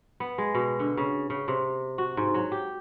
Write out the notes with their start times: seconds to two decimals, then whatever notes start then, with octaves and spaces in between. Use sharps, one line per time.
0.20 B3
0.38 G#3
0.55 B2
0.79 D3
0.97 C#3
1.30 C#3
1.48 C3
1.98 F#4
2.17 G#2
2.34 F#3
2.52 G4